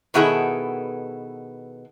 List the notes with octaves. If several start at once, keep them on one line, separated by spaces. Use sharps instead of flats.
B2 D#3 B3 E4 G#4 A4